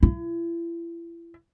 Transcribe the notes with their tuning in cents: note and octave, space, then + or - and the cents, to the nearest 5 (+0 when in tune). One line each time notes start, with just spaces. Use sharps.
E4 +35